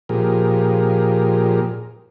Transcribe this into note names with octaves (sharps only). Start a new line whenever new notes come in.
A#2 F3 G4 G#4 A#4